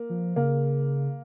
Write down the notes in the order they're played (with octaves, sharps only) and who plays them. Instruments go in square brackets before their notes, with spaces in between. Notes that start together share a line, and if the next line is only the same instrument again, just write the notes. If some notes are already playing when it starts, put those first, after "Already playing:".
Already playing: [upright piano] A#3
[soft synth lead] F3
[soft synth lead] C#3 [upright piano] A#3